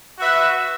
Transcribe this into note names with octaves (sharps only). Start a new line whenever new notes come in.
F#4 B4 E5